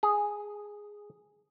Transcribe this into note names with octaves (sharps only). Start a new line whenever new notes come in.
G#4